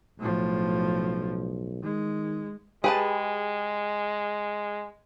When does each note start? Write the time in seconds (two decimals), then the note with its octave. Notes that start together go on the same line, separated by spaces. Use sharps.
0.19 B1 A2 F3
1.83 D#3 G#3
2.84 G#3 G4 G#4 B4 A5